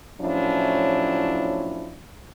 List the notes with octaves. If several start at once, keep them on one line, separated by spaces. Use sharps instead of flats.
A2 F3 F#3 C#4 D4 E4